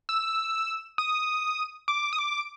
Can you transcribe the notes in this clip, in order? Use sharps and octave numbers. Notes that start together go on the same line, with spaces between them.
E6
D#6
D6
D#6
D6